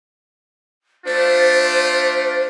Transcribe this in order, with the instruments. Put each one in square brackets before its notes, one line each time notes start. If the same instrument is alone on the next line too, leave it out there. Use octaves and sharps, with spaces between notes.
[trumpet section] A3 D4 F4 [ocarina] C5